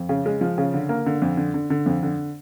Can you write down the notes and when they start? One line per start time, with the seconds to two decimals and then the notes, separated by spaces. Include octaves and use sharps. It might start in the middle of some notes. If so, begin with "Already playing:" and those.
Already playing: F2
0.09 C#3
0.26 G#3
0.41 F3
0.58 C#3
0.74 D3
0.89 A#3
1.06 D3
1.22 F2
1.37 D3
1.54 D3
1.70 D3
1.86 F2
2.03 D3